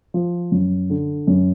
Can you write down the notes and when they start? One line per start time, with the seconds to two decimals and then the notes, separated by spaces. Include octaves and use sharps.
0.14 F3
0.52 F#2
0.90 D3
1.27 F#2